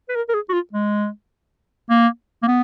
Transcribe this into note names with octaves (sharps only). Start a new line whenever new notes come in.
B4
A#4
A#4
G#4
F#4
F4
G#3
A#3
A#3
B3